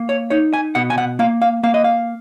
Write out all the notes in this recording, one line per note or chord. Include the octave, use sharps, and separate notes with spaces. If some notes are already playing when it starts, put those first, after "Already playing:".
Already playing: A#3
C#5
D#4 C#5
G#5
B2 F#5
G#5
F#5
A#3 F5
F5
A#3 F5
D#5
F5